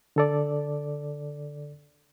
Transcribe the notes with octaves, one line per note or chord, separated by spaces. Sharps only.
D3 A4 D5